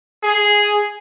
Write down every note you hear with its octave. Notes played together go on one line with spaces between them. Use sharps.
G#4